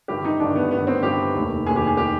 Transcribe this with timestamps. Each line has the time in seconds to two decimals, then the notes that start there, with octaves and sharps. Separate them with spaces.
0.08 G1 G2 D#3 G4
0.24 D#4
0.40 G1 G2 D#3 D4
0.55 B3
0.71 G1 G2 D#3 B3
0.87 C4
1.03 G1 G2 D#3 G4
1.34 F1 D#2 D#3
1.66 F1 D#2 D#3 G#4
1.76 G4
1.87 G#4
1.97 D#3 G4